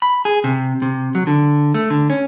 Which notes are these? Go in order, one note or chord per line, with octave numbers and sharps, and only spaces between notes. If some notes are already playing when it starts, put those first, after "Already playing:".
B5
G#4
C3
C3
F#3
D3
A3
D3
C#4